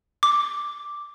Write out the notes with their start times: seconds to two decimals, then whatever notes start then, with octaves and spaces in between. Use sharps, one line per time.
0.23 D6